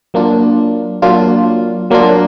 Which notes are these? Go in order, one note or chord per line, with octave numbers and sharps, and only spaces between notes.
F#3 A#3 D4 F4
F#3 A#3 D4 F4
F#3 A#3 D4 F4